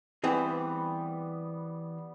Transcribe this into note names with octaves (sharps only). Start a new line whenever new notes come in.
E3 G3 B3 C4 G#4